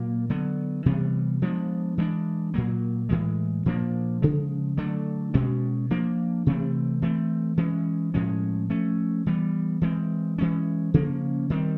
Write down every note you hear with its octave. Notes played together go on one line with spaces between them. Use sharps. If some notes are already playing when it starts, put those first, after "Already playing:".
Already playing: A#2 F#3 A#3
D3 F#3 B3
C3 E3 G3 B3
F3 G#3 B3 D4
E3 G#3 B3 D4
A#2 F#3 A#3
A2 E3 G#3
A#2 F3 A#3 D4
C#3 F3 G#3
D3 F#3 A3 D4
B2 G#3 C#4
F3 A#3 D4
C3 E3 A3 C4
E3 A3 C4
E3 G#3 C#4
A2 F3 G#3 C#4
F3 A3 C#4
E3 G3 B3
E3 G#3 C4
E3 G#3 C#4
C#3 F3 A#3 C#4
D#3 G3 C4